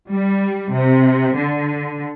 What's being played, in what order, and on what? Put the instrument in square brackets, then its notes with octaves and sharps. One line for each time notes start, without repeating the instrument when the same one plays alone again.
[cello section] G3
C3
D3